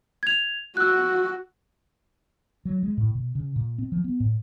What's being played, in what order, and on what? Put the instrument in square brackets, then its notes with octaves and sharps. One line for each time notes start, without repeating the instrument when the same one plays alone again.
[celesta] G#6 F7
[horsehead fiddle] F#4 [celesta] E6 F#6
[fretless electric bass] F#3
G#3
A2
B2
C#3
A#2
C4
F3
B3
A2